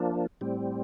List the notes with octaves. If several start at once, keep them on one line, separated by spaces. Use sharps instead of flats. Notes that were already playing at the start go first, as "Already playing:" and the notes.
Already playing: F3 A#3 D4
A2 G3 C4